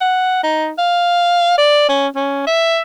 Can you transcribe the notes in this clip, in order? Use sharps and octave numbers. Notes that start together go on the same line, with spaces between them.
F#5
D#4
F5
D5
C#4
C#4
E5